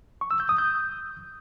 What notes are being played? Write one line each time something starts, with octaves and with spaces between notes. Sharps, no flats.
C#6
E6
G6
D#6
G6